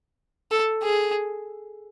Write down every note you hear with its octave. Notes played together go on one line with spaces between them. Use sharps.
A4
G#4